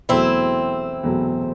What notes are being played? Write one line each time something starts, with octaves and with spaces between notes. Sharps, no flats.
E1 E2 B2 F#3 A3 C4 E4
E1 E2 B2 F#3 A3